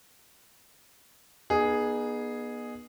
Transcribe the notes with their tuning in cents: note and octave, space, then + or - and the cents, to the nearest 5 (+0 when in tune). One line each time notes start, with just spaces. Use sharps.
B3 -35 D#4 -35 G#4 +0